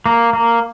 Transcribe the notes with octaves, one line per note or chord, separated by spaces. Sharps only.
A#3
A#3